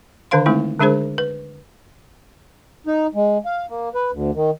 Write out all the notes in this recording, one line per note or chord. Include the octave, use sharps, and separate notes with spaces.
D3 D#3 D4 C5 F5 C6
G#3 A3 C4 D#4 E4
D3 G#3 D4 G#4 A#4 C5
B4
D#4
G#3
F5
A#3
B4
D2
D#3